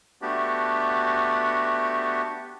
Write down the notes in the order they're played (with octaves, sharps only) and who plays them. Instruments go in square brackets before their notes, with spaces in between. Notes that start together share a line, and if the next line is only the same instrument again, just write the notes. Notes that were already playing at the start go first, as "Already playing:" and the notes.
[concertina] A3 B3 D4 F#4 G4